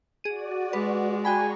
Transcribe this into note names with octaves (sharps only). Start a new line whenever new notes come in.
F#4 G#4 D5 D#7
G#3 B4
F#4 G#4 G5 G#5 A#5 B5 C#6